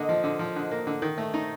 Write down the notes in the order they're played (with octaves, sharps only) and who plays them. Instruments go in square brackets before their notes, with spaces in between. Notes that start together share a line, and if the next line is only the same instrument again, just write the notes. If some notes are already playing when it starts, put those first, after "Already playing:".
Already playing: [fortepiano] D3 A#3 [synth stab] D#5
[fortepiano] F3
D3
F3
D3
A#3
D3
D#3
A3
D#4